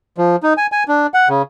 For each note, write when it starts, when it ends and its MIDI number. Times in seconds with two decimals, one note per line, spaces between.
0.18 0.36 53
0.43 0.54 63
0.58 0.67 80
0.72 0.84 80
0.88 1.07 62
1.14 1.28 78
1.29 1.42 49